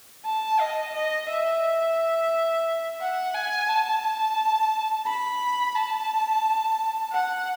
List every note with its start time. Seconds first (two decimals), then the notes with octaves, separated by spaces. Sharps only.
0.25 A5
0.60 D#5
0.94 D#5
1.29 E5
3.01 F#5
3.35 G#5
3.69 A5
5.06 B5
5.75 A5
7.12 F#5